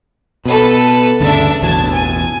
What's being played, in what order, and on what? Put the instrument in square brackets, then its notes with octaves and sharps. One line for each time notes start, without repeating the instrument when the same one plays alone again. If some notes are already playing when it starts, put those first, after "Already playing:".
[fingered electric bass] B2 [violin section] A4 B4
[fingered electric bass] D2 G2 C#3 [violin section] D4 E5 A5
[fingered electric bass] A1 E2 B2 [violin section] A5 G#6
[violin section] G#5